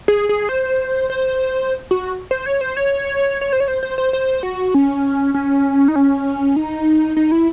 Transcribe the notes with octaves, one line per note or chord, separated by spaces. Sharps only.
G#4
G#4
C5
C5
F#4
C5
C#5
C5
C#5
C#5
C5
C#5
C5
C5
C5
C5
F#4
C#4
C#4
D#4
C#4
D#4
D#4
E4